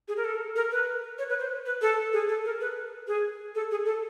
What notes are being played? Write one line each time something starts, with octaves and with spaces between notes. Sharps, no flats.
G#4
A#4
A4
A#4
B4
C#5
B4
C5
B4
A4
G#4
A4
A#4
B4
G#4
A4
G#4
A4